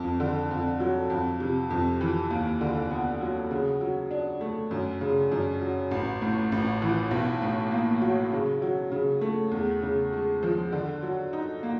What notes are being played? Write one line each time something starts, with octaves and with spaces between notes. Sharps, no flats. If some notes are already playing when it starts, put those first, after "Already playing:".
Already playing: F2
D3
F2
F#3
F2
C3
F2
E3
D#2
D3
B3
F#3
C#3
F#3
D4
A3
F#2
C#3
F#2
F#3
A1
A2
A1
E3
B1
A2
A#3
F#3
C#3
F#3
C#3
A3
E2
C#3
G#3
F3
D3
F#3
D#4
A#3